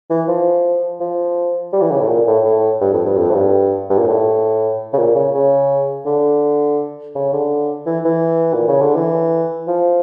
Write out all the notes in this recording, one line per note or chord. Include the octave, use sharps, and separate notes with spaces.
E3
F3
F3
G3
E3
C#3
A2
A#2
A2
A2
G2
F2
G2
F2
A2
G2
G2
A#2
A2
C#3
A#2
C#3
C#3
D3
C#3
D3
E3
E3
A#2
C#3
D3
E3
F3